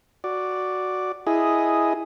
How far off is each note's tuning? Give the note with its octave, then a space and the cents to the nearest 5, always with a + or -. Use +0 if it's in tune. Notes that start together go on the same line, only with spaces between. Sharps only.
F#4 +0 D5 +0
E4 +0 G#4 +0 D#5 +0